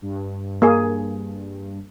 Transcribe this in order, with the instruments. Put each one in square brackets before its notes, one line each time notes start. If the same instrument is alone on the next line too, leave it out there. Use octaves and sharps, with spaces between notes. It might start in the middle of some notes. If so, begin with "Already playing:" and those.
[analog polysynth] G2
[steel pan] A#3 G#4